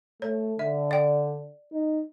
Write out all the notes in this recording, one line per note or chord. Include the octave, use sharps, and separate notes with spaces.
A3 C#5
D3 E5
D5 G5
D#4